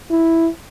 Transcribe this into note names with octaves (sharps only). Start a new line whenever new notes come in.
E4